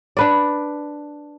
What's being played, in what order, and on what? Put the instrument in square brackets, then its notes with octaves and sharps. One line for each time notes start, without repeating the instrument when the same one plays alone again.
[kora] D4 B4 D5